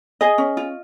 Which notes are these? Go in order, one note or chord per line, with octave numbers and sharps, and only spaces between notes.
G#4 D#5
C#4
F4